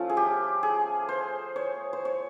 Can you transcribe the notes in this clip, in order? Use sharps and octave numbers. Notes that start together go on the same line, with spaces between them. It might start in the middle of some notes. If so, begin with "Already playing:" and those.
Already playing: F3 A3 C#4 F4
G#4
G4
G#4
C5
C#5
C5
C#5